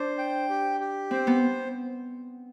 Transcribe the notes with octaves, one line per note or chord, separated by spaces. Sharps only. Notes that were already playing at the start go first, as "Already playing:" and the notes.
Already playing: D4 C5
G5
G4
G4
C4 C5
B3